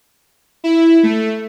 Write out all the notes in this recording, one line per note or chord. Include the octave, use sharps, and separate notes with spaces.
E4
A3